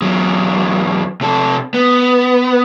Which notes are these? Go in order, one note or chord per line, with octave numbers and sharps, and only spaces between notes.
E2 F#3
C3 A4
B3